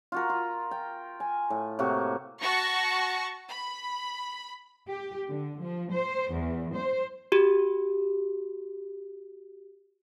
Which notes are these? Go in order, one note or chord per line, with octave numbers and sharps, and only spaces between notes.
F4 F#4 A#4
F4
G5
G#5
A2
A2 C3 A#3 F#4
F#4 A5 C#6 A#6
B5
G4
D3
F3
C5
E2
C5
F#4 G4